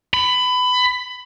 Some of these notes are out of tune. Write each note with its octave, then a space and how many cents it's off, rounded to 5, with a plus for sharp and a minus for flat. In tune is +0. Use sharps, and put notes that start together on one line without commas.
B5 +20